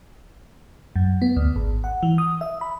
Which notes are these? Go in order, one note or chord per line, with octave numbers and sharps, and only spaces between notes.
F#2
B3
D2
G#1
F#5
E3
D#6
E5
B5